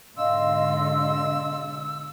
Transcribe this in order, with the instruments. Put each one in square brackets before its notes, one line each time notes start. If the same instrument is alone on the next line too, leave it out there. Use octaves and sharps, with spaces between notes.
[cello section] G#2 B2 D3 [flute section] D#5 F5 C6 [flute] E6